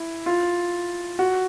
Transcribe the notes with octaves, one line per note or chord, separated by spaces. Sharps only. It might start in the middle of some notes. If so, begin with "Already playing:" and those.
Already playing: E4
F4
F#4